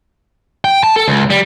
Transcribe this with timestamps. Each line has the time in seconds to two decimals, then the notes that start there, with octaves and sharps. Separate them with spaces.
0.64 G5
0.83 A5
0.96 A4
1.08 C#2
1.30 G3